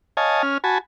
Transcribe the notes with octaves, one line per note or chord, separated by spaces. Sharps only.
C#5 D#5 F5 G#5 A5
C#4 F6
F#4 G#5 A5 B5